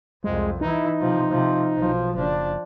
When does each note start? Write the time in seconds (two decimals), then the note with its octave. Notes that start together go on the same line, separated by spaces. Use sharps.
0.24 C2 F2 G#3
0.61 E3 D#4 E4
1.01 C3 F3
1.31 C3 F3
1.76 B1 F3
2.15 F#1 F3 D4